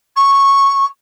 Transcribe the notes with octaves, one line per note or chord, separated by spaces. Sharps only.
C#6